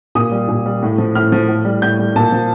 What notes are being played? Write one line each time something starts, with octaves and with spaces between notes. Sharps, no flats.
A#2 D#6
G3
A#2
G3
A2
F3
A2 F6
F3
A2
G3
A2 G6
G3
A#2 A5
F3